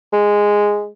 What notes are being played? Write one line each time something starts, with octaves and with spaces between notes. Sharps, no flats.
G#3